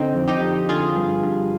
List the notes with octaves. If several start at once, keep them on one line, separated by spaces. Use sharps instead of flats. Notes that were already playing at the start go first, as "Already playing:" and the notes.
Already playing: D3 C4 D#4
F2
D#4 G4
F2
D3 F4 G#4
G2
G2